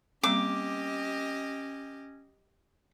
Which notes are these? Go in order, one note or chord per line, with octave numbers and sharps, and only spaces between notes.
G3 A#3 C4 C#4 G4 D#5 D6